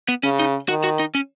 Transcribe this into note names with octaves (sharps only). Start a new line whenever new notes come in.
B3
C#3 C#4
D#4
D#3 F#4
F#4
D#4
C#4